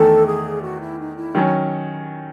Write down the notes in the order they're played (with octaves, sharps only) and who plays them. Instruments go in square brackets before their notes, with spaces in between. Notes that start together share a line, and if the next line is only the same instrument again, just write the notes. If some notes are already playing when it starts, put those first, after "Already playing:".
Already playing: [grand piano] E2 D#3 A3 [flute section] A4
[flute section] G#4
F#4
E4
D#4
E4
[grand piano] D#3 F#3 C#4